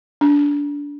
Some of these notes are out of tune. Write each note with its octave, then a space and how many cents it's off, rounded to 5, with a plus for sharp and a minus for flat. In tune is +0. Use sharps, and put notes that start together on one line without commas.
D4 -25